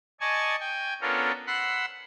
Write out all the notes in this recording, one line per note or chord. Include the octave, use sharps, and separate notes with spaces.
D5 D#5 G#5 A5 C#6 G#6
G5 G#5
B3 C#4 D4 F4 A4 A#4
F#5 B5 C6 E6 F#6